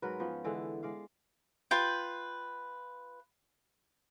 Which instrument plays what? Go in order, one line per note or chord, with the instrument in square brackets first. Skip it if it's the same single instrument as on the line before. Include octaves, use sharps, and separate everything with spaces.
[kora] G#2 F#3 A#4 B4
F3 B3 C#4
D3 E3 G#3 A4
G#3 D5 F5
[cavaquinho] F4 B4 G5